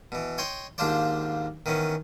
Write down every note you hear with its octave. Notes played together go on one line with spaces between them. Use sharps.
B2 E3
C#5 D#5 G5 C6
D#2 G#2 D4 F4 C5 D5
D#3 E3 B3 C#4